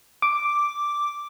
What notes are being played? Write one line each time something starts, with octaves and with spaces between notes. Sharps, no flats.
D6